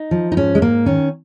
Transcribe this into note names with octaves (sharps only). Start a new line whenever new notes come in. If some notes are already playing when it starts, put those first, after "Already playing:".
Already playing: D#4
F3
D#4
G#2 C#4
G#3
G#2 A#3
D#3 C#4